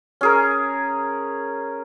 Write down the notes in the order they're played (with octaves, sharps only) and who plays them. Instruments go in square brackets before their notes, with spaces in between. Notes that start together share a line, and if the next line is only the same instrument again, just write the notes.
[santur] C#4 G#4 A#4